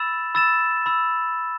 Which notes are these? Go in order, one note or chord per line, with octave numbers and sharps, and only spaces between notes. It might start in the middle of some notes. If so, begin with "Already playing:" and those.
Already playing: B5 E6 A6 E7
B5 E6 A6 E7
B5 E6